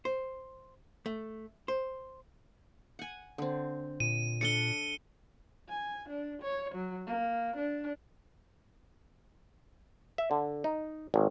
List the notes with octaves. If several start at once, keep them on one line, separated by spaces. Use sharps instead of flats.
C5
A3
C5
F#5 G#5
D3 C4
A#2 D#7
D4 A4 D5 C#7 G7
G#5
D4
C#5
F#3
A#3
D4
E5
D3
D#4
G#1